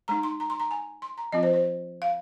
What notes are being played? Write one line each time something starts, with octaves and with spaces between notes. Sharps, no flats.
G#3 D#4 A#5
C6
A#5
C6
A#5
G#5
C6
A#5
F3 C4 F4 D#5
C5
C5
F5